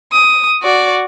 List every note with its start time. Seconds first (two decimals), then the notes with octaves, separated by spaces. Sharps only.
0.12 D#6
0.63 F#4 D5